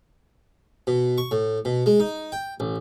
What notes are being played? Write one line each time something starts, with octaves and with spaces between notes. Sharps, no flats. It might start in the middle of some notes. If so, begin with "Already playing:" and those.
B2
C#6
A2
B2
G#3
D#4
G5
A1